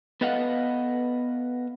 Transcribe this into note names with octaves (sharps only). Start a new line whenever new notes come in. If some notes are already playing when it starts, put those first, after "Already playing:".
B3 A4 B4 D#5 F5 F#5